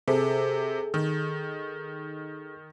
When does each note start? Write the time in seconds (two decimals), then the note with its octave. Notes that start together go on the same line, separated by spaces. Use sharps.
0.08 C3 G#4 A4
0.94 D#3